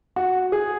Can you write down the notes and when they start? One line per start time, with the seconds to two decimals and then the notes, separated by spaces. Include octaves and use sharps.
0.16 F#4
0.52 G#4